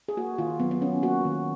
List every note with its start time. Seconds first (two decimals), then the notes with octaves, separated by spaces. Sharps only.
0.08 G#4
0.17 A#3 F#4
0.38 D#3 F4
0.60 F#3 B3
0.71 B3
0.81 D#3 C#4
1.02 A#3 F#4
1.25 D#3